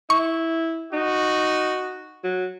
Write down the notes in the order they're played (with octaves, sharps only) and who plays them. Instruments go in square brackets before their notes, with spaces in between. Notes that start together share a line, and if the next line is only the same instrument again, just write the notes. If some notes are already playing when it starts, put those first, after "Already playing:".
[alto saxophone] E4 [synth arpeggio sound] C#6
[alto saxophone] D#4 [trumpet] F#4
[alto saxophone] F#3